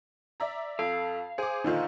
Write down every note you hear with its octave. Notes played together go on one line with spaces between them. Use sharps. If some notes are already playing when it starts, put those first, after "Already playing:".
D5 E5 A#5
F2 A4 F5
G#4 C5 G#5 D6
A#2 D3 D#3 D#4 F4